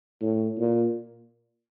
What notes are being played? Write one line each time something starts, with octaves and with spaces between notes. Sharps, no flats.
A2
A#2